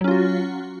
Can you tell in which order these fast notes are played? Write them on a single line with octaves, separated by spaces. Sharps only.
F#3 C#4 F4 F#4